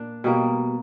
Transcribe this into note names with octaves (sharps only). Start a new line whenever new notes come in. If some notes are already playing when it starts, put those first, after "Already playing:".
Already playing: A#2 D4
B2 G3 A#3